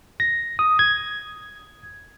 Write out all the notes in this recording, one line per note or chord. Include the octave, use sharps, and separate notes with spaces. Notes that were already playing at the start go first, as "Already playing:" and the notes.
A#6
D#6
G#6